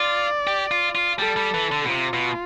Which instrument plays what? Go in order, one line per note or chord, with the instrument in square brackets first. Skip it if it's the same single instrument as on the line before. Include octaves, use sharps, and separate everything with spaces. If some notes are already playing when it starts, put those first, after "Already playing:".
Already playing: [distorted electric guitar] F4 [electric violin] D5
[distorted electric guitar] G4
F4
F4
[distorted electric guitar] G3 [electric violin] A4
[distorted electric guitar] G3
E3
D3
B2
[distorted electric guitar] C3 [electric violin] F4
[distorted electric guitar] B2